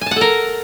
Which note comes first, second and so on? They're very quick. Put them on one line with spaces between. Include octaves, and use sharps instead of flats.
G#5 A5 F#5 A4 A#4